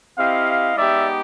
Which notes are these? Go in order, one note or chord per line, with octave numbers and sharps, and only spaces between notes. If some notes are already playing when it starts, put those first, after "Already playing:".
C4 E4 G4 D#5 F5
G#3 B3 D#4 G4 D5 E5